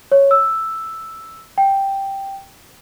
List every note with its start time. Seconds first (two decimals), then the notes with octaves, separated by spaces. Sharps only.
0.12 C#5
0.31 E6
1.58 G5